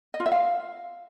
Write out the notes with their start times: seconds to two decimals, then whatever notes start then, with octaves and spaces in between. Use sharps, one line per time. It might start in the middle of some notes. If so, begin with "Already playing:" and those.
0.14 D#5
0.20 F4
0.26 E5
0.32 F5